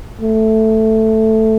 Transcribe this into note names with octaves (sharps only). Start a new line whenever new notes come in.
A3